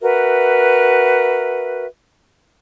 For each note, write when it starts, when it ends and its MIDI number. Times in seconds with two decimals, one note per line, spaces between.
0.01 1.85 66
0.01 1.85 70
0.01 1.85 71
0.01 1.85 76